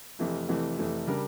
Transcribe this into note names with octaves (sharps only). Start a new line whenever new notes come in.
F1 F2 E3 A3
F1 F2 E3 A3
F1 F2 E3 A3
C#3 G3 D4 G4 A#4